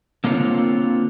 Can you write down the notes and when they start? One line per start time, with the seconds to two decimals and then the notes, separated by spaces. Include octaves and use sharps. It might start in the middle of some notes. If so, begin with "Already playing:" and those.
0.24 D3 A#3 C4 F4 C#5